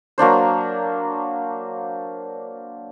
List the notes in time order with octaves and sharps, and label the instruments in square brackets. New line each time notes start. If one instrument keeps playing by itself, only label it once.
[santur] F#3 A#3 D4 C5